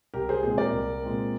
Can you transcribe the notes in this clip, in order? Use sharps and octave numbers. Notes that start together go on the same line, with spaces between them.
C2 G4 A#4
G#4 C5
A#2 G#3 C4 G#4 C5
A#4 D5
C2
A#2 G#3 C4